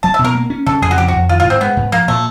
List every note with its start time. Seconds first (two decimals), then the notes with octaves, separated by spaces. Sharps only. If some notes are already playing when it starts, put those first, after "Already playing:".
0.03 F#3 A5
0.14 B2 E5
0.24 A#4
0.35 A#3
0.50 C#4
0.66 C#3 A4
0.82 F2 G#4
0.91 F#4
0.98 F3 G4
1.08 F#4
1.14 F2
1.29 D#3 F4
1.40 G#2 F4
1.50 C4
1.61 G#3 B3
1.77 G#2
1.92 F3 A#3
2.08 A#2 A3